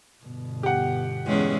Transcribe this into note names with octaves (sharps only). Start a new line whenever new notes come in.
G1 B2
G4 F#5
E2 G#3 C#4